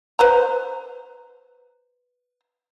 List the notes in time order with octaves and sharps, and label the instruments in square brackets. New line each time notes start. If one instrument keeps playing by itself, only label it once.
[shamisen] B4 C5 A#5